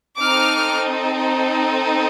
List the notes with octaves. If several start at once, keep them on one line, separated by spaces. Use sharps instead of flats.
C4 D#4 A4 D6 F6